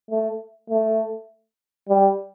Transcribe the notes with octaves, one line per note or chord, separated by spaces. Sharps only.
A3
A3
G3